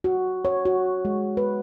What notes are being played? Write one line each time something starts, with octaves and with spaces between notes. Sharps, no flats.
F#4
C#5
F#4
G#3
B4